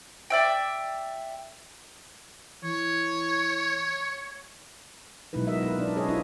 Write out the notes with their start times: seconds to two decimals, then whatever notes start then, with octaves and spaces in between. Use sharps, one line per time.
0.30 D5 E5 G5
2.64 E3 C#5
5.33 B2 F#3 G#3 D#4 E4 B4
5.47 F4 F#4 A#4 D#5 E5
5.63 A#4 B4
5.79 D4 D5
5.96 C#4 G#4 B4 C#5 D#5
6.08 D4 E4 F4 G#4 E5